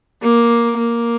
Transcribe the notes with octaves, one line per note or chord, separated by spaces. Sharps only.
A#3
A#3